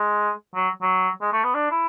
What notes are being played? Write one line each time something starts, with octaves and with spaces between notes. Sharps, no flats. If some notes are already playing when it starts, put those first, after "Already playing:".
Already playing: G#3
F#3
F#3
G#3
A3
B3
D4
E4